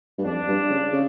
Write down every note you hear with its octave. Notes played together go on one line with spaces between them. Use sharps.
G2
F2 D4
G2
C#3
C#3